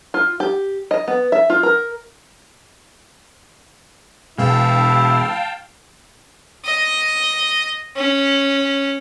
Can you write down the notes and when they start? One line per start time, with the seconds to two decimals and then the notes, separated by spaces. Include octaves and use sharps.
0.14 F4
0.40 G4
0.91 D#5
1.08 B3
1.32 E5
1.50 F4
1.63 A#4
4.38 E1 B2 G#3 E4 F5 G5 A5
6.65 D#5
7.96 C#4